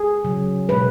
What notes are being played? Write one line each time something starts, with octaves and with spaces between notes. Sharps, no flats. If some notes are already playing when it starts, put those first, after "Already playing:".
Already playing: G#4
C#3 F#3
B2 G#3 B4